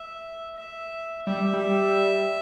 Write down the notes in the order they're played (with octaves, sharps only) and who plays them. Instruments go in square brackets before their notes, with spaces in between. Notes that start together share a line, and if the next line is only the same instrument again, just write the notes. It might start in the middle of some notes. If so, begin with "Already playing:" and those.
Already playing: [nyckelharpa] E5
E5
[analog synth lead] G3 [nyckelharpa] E5
[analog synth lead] G3